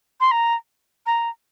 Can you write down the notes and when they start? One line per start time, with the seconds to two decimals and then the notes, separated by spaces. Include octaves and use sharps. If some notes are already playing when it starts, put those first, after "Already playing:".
0.20 C6
0.31 A#5
1.06 A#5